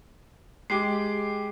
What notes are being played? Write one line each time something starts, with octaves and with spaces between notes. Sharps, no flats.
G#3 G4 D6 C7